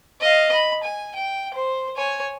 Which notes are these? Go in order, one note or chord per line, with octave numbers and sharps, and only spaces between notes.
D#5 F5
B5
G#5
G5
C5
C#5 G#5